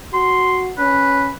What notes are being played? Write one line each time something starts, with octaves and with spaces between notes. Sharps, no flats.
F#4 C6
C#4 B4